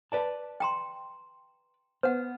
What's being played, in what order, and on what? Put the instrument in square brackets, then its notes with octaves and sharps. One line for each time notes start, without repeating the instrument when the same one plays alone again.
[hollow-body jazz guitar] B4 D5 A5
[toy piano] G5 A#5 C6
[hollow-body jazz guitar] B3 [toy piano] B4 F#5 [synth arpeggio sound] C5